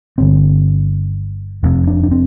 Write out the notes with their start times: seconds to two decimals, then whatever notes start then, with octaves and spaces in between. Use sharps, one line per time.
0.18 G1 G2 D3 C4
1.63 F1 F2 C3
1.87 D4
2.03 D4
2.11 C4